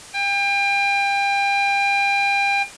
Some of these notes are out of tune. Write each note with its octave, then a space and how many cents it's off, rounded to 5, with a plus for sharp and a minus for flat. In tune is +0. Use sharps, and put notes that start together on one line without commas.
G5 +35